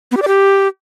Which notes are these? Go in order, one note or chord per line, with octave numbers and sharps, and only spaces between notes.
B3
G4
D5
G4